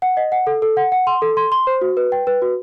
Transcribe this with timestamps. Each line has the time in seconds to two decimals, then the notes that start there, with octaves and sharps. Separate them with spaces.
0.02 F#5
0.17 D#5
0.32 F#5
0.47 A4
0.62 A4
0.77 F#5
0.92 F#5
1.07 C6
1.22 A4
1.37 C6
1.52 C6
1.67 C5
1.81 F#4
1.97 B4
2.12 G5
2.27 B4
2.42 F#4